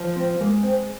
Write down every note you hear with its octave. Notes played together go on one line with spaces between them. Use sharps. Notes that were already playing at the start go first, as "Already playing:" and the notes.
Already playing: F3
C4
G#3 A#3
C4